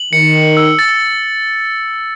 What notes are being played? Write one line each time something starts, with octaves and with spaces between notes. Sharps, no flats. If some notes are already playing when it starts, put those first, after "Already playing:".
Already playing: F#7
D#3 C#7
C#7
E6
A6